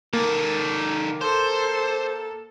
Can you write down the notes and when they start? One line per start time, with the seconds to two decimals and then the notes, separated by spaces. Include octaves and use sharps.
0.13 D#3 A#3 A4
1.21 A4 C5